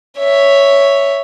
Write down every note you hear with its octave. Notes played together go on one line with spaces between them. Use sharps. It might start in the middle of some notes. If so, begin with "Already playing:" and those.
C#5 E5